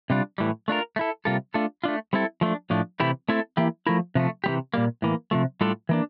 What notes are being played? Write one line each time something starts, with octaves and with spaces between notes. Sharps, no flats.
C3 G3 D4 F4
A2 E3 G3
A3 D4 F4 A#4
A3
E4 A4
C3 G3 A#3 F4 A4
A3 D4 F4 A4
A3 D4 F4
G3 C4 E4 A4
F3 A3 D4
A2 F3 A3 D4
C3 E3 A3 E4 G4
A3 C4 E4 A4
E3 A#3 E4 G4
F3 A3 E4 A#4
C3 F3 A3
C3 E3 G3 C4 G4
A#2 G3 A#3
A2 E3 A#3
C3 F3 A3
A2 G3 D4 F4 A4
E3 A#3 D4